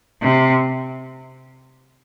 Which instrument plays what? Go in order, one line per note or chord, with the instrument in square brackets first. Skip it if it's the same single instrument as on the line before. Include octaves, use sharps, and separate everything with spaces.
[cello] C3